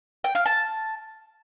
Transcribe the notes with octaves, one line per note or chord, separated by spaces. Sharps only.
G5
F5
A5